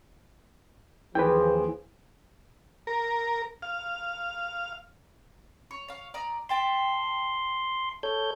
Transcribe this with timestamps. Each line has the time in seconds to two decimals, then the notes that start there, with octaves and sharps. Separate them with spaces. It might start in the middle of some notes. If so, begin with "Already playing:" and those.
1.15 D#2 E3 F3 G#4 B4 G5
2.87 A#4
3.62 F5
5.71 C#5
5.88 C#5 F5
6.14 D5 A#5 D#6
6.49 E5 G5 A5 C6
8.03 A4 C#5 G6